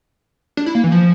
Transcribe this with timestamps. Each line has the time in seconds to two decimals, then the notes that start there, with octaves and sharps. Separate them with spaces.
0.57 D4
0.66 E4
0.75 A#3
0.84 E3
0.92 F3